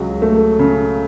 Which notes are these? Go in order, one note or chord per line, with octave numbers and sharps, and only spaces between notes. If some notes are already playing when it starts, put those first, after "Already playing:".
Already playing: C#2 F#3
A3
C#3